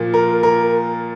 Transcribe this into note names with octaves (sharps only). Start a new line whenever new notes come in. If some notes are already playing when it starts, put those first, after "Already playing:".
Already playing: A#2 F3 A#3 F4
A#4
A#4